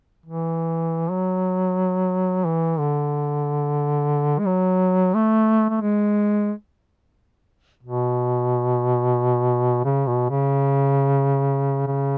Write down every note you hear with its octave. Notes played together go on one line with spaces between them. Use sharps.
E3
F#3
E3
D3
G#3
F#3
A3
A3
G#3
B2
C#3
B2
C#3
C#3